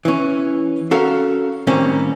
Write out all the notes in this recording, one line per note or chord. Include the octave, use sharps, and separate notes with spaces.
E3 C#4
C#4 F#4 A4 A#4 F5
A2 D#3 G3 A#3 C4 C#4